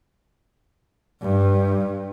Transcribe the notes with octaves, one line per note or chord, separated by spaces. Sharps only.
G2